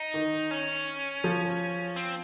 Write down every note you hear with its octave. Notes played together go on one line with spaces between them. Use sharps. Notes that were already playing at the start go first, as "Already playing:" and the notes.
Already playing: D#4
D#3
C#4
F3
C4